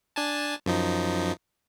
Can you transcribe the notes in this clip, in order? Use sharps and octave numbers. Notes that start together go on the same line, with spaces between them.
D4 G#5 A5
F#2 F3 D#4